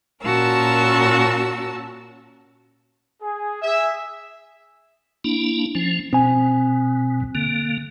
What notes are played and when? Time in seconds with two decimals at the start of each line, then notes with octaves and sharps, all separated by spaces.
0.23 A#2 C#4 F#4 A#4 A5 E6
3.21 G#4
3.62 G#4 E5
5.24 A#3 D4 E4
5.75 F3 C#4
6.13 B2 C4 G#5
7.35 D3 A#3